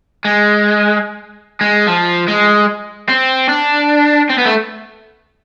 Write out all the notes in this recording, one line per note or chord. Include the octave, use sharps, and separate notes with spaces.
G#3
G#3
F3
G#3
C4
D4
C4
B3
A3